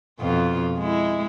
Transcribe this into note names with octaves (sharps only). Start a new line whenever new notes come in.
F2 B2 F4
G#3 E4